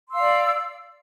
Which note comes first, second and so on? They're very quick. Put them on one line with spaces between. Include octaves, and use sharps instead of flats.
C6 E6 F5 D5